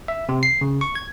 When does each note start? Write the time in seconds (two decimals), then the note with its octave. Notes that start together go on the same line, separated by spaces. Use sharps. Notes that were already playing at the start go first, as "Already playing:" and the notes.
0.08 E5
0.29 C3
0.43 C7
0.61 C#3
0.81 C#6
0.95 G#6